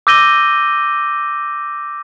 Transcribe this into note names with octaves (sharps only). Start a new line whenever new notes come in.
D6 E6 G6 A#6 D#7 G7